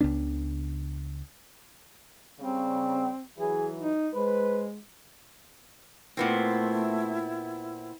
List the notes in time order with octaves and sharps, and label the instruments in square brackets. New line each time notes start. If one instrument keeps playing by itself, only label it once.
[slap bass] C#2 C#3 B3 D4
[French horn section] C#3 G3 [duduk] C4
[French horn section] E3 F#3 [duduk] G#4
[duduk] D#4
[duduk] G#3 [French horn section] B4 C5
[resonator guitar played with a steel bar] A#2 B3 C4 [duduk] A3 [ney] E4